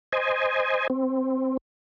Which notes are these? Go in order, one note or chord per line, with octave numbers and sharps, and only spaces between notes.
C5 D#5 G#5
C4